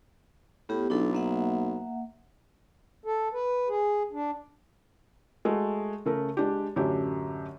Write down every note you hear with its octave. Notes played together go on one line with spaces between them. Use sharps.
A2 B3 G4
B1 D4 E4 A4
A#3 E5 F#5
A4
B4
G#4
D4
G#3 A3 F#4
C#3 A3 A#4
G#3 D4 G4
A1 F#2 D3 C#4 D4 G4